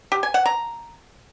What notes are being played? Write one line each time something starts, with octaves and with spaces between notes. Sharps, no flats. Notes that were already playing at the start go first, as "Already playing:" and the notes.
G4
G#5
F#5
A#5